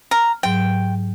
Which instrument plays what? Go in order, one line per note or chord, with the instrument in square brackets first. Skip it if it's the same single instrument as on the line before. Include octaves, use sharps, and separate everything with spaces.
[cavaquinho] A#5 [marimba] F6
[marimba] G#2 F#3 [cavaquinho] G5